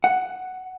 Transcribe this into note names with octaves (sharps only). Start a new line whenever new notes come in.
F#5